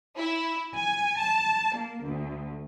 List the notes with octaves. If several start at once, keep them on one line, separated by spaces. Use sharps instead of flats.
E4
G#5
A5
A#3
D2